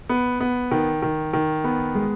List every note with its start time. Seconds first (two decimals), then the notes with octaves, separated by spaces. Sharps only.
0.09 B3
0.40 B3
0.71 D#3
1.02 D#3
1.34 D#3
1.64 B3
1.95 G#3